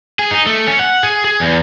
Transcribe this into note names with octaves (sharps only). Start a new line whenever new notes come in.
G#4
D#4
A3
C#4
F#5
G#4
G#4
E2